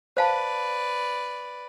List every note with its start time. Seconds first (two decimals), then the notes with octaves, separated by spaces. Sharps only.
0.17 B4 C5 D5 F5 A5